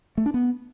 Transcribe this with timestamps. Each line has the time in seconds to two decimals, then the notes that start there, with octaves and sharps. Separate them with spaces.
0.18 A3
0.26 D4
0.34 B3